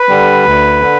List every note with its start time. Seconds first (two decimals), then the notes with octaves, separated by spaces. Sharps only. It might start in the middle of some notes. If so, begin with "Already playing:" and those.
Already playing: B4
0.09 D3 G3
0.45 D2
0.82 D3